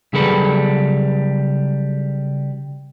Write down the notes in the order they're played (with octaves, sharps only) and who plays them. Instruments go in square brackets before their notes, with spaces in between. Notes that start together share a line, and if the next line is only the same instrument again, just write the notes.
[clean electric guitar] C#3 F#3 G3 G#4 A4 B4